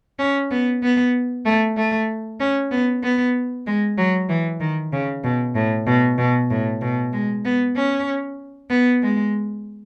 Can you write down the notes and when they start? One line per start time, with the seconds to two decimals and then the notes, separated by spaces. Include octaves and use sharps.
0.19 C#4
0.51 B3
0.83 B3
1.45 A3
1.77 A3
2.40 C#4
2.71 B3
3.03 B3
3.66 G#3
3.98 F#3
4.29 E3
4.60 D#3
4.93 C#3
5.24 B2
5.56 A2
5.87 B2
6.18 B2
6.50 A2
6.81 B2
7.13 G#3
7.45 B3
7.76 C#4
8.70 B3
9.02 G#3